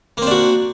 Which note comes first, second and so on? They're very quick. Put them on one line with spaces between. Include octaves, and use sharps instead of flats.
A#3 C4 D4 F#4